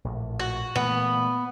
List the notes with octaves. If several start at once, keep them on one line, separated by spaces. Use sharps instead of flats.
A#1 A2
F#4
A#2 E3 A3 B3